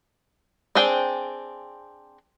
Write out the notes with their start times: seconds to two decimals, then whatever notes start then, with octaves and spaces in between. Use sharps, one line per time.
0.75 C4 D4 G#4 G5